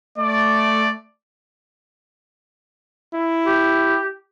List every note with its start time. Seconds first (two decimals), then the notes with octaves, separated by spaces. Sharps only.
0.19 A3 D5
3.14 E4
3.45 G4